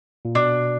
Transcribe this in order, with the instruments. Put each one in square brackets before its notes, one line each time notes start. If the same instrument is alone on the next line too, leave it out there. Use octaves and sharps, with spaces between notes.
[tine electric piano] A#2
[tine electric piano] B2 [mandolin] D4